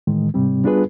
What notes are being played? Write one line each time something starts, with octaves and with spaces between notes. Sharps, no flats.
A2 D#3 E3 G#3
G#2 C3 G3 C4
G3 B3 D4 F4 G#4 B4